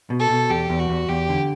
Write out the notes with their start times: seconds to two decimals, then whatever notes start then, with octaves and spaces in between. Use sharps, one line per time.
0.10 B2
0.20 A4
0.30 B2
0.50 E2 G4
0.69 E2
0.79 F#4
0.89 E2
1.09 E2 G4
1.29 D3